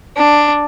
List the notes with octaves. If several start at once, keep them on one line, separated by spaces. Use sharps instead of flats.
D4